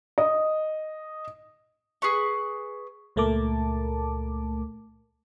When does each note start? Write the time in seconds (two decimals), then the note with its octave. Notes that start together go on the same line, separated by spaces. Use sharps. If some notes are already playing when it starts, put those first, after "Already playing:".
0.18 D#5
2.02 G#4 B4 C#6
3.16 C#2 A#2 A3 A#4 A5 D6